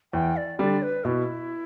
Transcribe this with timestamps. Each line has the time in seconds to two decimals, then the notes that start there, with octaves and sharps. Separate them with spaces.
0.13 E2 G5
0.37 D5
0.59 D3 G3 D4 D5
0.83 B4
1.05 B2 E4